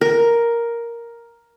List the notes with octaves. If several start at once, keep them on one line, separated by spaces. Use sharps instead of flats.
A#4